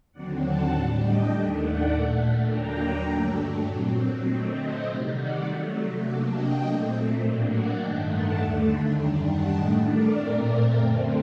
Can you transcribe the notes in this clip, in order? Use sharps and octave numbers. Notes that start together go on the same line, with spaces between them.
D#2 D3 F#3 C4 D5 F#5
F#5 A5
A2 G3 D4 F#5 A5
D#5 G5
D#2 D#3 A3 D4
D5 F#5
A#2 A3 D4 D5 F#5
D#2 D3 F#3 A#3 D4 G5 A#5
G2 F#3 A3 D4
A#2 F#3 C4
D3 F#3 A3 C4 D#5 G5
C5 D#5
C3 D#3 G3
D5 F#5
C3 F#3 A3
C3 F#3 A#3 D4 D5 F#5
D#5 G5
A#2 A3 C4
A2 F#3 A#3 D4
D5 F#5
G2 D#3 A3 D4 D#5 G5
F#5 A5
D#2 D3 A3 D4
F#2 D#3 G3 D4 G5 A#5
F#5 A5
A2 A3 D4 D#5 G5
A#4 D5
A#2 A3 C4 A#4 D5
F#2 D3 A3 C4 G4 A#4